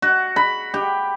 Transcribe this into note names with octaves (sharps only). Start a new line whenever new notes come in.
F#4
B5
G4